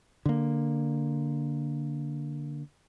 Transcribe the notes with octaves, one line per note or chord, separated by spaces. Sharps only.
D3 A#3